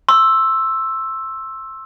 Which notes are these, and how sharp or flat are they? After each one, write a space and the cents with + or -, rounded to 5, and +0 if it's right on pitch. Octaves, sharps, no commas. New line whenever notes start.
C6 +30 E6 +0